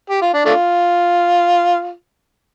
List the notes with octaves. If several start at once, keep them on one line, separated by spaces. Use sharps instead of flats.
G4
F4
D4
A3 D4 F4